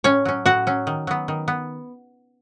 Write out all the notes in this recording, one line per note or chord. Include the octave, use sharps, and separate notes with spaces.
A2 C#4 C#5
F#3 C#4
A2 F#4 F#5
F#3 C#4
D#3
F#3 B3
D#3
B3